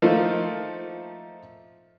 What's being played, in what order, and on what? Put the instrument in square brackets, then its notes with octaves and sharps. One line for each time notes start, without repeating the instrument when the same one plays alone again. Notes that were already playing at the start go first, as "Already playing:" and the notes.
[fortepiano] F3 A3 A#3 D#4 F4